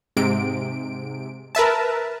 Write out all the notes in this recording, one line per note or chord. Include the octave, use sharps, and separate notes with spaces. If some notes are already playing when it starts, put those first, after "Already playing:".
G#2 C3 D7
A#4 B4 E5 A5